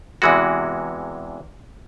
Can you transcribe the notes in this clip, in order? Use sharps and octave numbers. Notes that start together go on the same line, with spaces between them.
E2 C3 E3 G#3 F#4